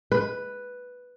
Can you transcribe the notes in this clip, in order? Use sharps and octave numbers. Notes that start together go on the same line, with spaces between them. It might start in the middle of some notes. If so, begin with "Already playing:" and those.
B4